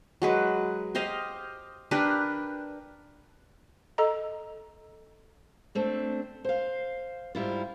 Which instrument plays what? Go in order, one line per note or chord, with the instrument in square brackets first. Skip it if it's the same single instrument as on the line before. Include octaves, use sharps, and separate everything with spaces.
[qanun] F#3 G#3 B4
G4 C5 D#5 F5
D4 G4 A#4 B4
[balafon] A4 D#5 A#5
[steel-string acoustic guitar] A3 C4 D4
C5 F5
G#2 G3 E4 F4